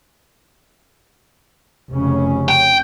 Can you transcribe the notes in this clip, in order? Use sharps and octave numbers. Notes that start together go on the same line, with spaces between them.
F1 C#3 C#4
G5